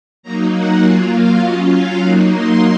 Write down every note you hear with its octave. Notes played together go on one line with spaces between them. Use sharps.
F#3 A#3 D#4 A#5
F#5
F#3 A#3 F4 G#5
F5
F#3 C#4 F4 D#5
F5
F#3 A#3 D#4 F#5
C6